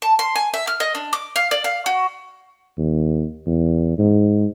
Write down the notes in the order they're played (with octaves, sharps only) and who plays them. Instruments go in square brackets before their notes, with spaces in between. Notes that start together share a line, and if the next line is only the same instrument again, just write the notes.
[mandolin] A5
C6
G#5
E5
F6
D#5
D4
D6
F5
D5
F5
F#4
[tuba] D#2
E2
G#2